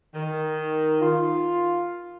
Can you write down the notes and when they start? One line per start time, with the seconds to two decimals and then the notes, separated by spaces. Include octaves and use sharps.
0.15 D#3
1.01 F4